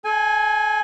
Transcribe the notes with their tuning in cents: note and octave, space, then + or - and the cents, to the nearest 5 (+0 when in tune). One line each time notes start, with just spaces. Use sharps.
A4 -40 G#5 +0